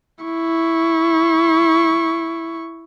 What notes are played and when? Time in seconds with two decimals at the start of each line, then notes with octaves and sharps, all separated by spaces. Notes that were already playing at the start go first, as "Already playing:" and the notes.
0.24 E4 C#6